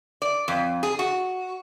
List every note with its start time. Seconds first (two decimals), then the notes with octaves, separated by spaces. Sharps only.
0.22 D5
0.48 F2
0.83 G#4
0.99 F#4